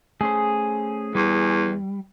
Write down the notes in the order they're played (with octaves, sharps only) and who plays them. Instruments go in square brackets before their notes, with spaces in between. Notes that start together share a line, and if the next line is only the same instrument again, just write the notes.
[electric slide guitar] A3 C#4 C5 [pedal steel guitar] G#4
[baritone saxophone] E2 [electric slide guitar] G3